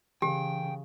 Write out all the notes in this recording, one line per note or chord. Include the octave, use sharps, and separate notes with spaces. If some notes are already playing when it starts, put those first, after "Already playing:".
C#3 E3 G4 G5